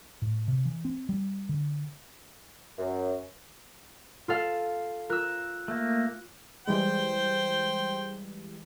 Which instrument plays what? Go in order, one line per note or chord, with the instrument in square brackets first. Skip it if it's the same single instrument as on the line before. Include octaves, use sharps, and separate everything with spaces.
[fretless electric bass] A2
C3
E3
C4
G3
D3
[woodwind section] F#2
[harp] F4 A4 F5
[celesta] F4 F#6 [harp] A#4 E6
[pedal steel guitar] A3 A#3
[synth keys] E3 G3 G#3 [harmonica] C5 G5